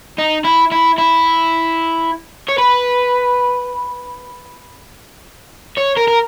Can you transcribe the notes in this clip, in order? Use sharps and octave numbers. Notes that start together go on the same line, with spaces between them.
D#4
E4
E4
E4
C#5
B4
C#5
A#4
A#4